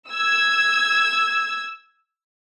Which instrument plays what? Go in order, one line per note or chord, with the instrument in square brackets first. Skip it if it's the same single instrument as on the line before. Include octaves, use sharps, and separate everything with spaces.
[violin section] E6 G#6